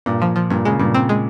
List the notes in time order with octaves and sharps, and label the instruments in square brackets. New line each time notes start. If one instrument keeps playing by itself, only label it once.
[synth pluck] G2 [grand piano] A#2
[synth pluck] F3
F3
[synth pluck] G2 [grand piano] A#2
[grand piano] C#3 [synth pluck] G#3
[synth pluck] G2 [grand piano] A#2
[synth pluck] C4
G#3